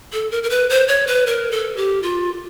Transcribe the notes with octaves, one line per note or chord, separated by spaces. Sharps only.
A4
A#4
A#4
B4
C5
C#5
B4
A#4
A4
G4
F4